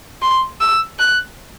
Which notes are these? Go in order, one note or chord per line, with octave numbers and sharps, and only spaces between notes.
C6
E6
F#6